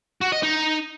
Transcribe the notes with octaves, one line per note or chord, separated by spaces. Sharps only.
F#4
D#5
D#4